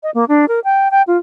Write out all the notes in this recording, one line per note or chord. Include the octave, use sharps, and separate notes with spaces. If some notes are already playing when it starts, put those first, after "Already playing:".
D#5
A#3
D4
A#4
G5
G5
F4